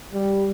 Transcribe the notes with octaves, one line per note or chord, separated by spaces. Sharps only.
G3